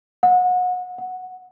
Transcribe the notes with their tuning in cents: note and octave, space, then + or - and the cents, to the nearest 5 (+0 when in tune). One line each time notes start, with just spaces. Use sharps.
F#5 -30
F#5 -5